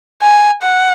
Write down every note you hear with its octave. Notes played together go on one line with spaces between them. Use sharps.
G#5
F#5